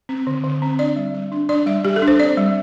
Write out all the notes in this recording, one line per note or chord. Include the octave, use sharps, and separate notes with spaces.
C4
D3
D3
C4
D4 D5
G3
G3
D4
D4 D5
G3 E5
G3 G4
A4
D4
C5
C4 D5
G3